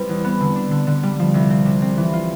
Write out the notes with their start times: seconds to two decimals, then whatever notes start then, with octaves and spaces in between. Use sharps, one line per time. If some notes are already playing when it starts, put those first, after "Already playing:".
Already playing: G3 C4 E4 B4
0.09 E2
0.24 B3
0.41 D3
0.56 D4
0.71 D3
0.87 D3
1.03 G3
1.19 F3
1.34 C2
1.50 C4
1.66 C3
1.82 C4
1.97 E3
2.13 F4